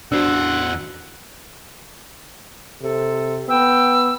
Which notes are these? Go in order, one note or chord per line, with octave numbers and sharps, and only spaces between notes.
E2 D4 F#4 C5 F#5 E6
C3 A4
B3 G5 E6